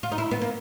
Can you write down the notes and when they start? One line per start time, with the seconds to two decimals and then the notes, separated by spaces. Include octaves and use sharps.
0.03 F4
0.11 D#4
0.18 E4
0.31 B3
0.41 A#3